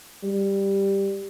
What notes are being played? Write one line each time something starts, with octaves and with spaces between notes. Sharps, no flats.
G3